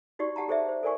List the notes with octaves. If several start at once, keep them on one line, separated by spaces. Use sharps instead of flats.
D#4 F#4 G4 D5 C#6
G4 F#5 A5 A#5
G#4 A4 C5 D5 E5
C5
A4 A#4 D5 G#5 C#6